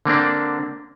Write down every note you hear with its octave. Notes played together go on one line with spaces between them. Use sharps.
D3 A#3 C4 D4